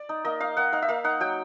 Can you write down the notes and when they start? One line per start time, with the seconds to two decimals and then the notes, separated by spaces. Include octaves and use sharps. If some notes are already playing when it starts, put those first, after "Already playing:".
Already playing: D5
0.09 D#4
0.25 A#3 D#5
0.40 D#4 F5
0.57 A#3 F#5
0.73 D#4 F5
0.82 E5
0.89 A#3 F5
1.04 D#4 F#5
1.20 F#3 G5